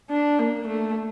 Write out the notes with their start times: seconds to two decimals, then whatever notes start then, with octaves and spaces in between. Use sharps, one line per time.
0.10 D4
0.39 A#3
0.67 A3